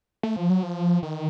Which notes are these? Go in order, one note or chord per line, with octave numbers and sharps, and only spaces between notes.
A3
F3
F#3
F3
D#3